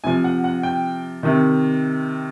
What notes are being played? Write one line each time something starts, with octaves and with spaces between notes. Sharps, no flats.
C3 F3 G#5
F#5
F#5
G5
C3 D#3